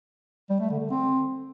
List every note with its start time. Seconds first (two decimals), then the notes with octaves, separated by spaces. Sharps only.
0.50 G3
0.60 A3
0.70 D3
0.80 D3
0.90 C4